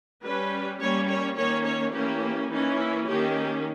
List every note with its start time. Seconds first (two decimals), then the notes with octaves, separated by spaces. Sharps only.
0.23 G3 C#4 B4
0.80 G3 A#3 C#4 C#5
1.08 C#5
1.37 D#3 A#3 C#4 C#5
1.66 C#5
1.93 E3 A#3 C#4 G4
2.50 E3 A#3 C#4 D#4
2.78 E4
3.06 D#3 A#3 C#4 G4